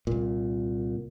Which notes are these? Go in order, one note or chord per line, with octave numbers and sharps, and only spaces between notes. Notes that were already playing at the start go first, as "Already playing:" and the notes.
C2 A#2